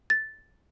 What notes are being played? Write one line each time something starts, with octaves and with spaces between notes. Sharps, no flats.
A6